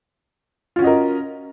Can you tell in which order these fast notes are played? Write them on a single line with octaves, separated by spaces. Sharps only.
F4 C#4 F#4 D#5 A#4